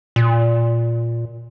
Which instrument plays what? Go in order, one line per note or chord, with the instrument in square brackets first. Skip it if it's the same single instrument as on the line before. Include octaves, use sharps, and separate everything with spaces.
[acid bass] A#2